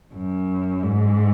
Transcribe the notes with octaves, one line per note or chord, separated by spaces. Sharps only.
F#2
G#2